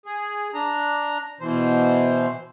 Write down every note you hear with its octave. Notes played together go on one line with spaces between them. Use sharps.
G#4
D4 A#5
B2 E3 C5